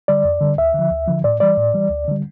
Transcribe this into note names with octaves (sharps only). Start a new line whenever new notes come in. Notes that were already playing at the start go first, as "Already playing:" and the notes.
D3 G3 D5
F2
D3 G3
D2 E5
D3 F3
D2
D3 F3
A2 D5
E3 G3 D5
A2
E3 G3
D2
D3 G3